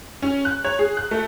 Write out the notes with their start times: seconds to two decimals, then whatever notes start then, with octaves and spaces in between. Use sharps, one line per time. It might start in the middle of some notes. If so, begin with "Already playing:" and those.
0.22 C#4
0.45 F#6
0.65 C#5
0.79 G#4
0.97 F#6
1.11 A3